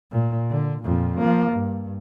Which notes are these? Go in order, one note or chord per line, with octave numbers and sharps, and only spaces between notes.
A#2
D3
F2 A#2
F3 A#3
G2